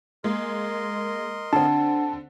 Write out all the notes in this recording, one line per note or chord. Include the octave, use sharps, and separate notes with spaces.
G#3 A#3 A#4 D#5 C6
D3 C4 D4 F#5 A5